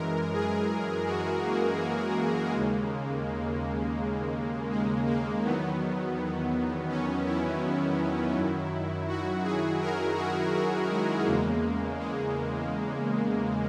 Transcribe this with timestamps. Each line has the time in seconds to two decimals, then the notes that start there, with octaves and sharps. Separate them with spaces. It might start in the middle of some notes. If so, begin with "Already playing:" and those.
Already playing: F#2 E3 G#3 A#4
0.34 G#4
1.06 F#4
1.42 A#3
1.79 A#3
2.51 D#2 C#3 G#3
4.71 G#3
5.07 A#3
5.43 E2 D#3 F#3 B3
6.89 C#4
7.25 E4
8.35 F#2 D#3 F#3
9.08 F#4
9.43 G#4
9.81 A#4
10.17 F#4
10.54 F#4
10.89 G#3
11.26 E2 C#3 G#3 A#3
11.99 G#3